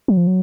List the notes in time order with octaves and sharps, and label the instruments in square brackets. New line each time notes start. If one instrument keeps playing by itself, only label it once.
[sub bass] F#3
F3
F#3